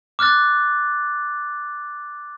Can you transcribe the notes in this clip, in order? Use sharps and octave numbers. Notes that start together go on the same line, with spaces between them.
D6 F6 F#6 A6